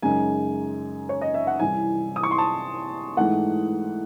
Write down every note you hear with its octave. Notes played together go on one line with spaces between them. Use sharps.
F#2 C#3 G#3 D#4 G#5
C#5
D#5
E5
F#5
C2 C3 E3 G#5
D#6
C#6
C6
A5
G#2 E3 A3 F#5